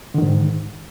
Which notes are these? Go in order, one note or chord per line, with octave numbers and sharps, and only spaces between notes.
G#2 D3 D#3